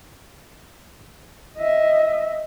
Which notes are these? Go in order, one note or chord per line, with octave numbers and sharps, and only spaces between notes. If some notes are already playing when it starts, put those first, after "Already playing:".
D#5 E5